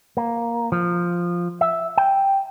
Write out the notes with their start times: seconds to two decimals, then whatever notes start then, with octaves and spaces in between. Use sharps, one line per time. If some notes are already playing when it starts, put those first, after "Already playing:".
0.17 A#3
0.72 F3
1.61 E5
1.97 G5